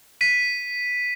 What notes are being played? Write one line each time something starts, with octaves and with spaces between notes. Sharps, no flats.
B6 D#7